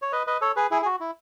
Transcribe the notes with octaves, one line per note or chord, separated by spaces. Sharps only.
C#5
B4 D#5
B4 D#5
A4 C#5
G#4 B4
E4 G#4
G#4
F#4
E4